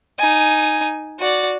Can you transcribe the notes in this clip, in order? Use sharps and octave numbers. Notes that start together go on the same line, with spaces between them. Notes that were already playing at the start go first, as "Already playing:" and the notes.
D#4 G#5
F#4 D5